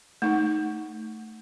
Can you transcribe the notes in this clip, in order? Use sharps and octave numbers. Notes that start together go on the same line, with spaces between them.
A3 D#4